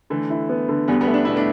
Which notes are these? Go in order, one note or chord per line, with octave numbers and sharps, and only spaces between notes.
D3 E3 A3
E4
B3
D3
E2 G3 B3
G3 B3
A3
D4
B2 E4
A3 D4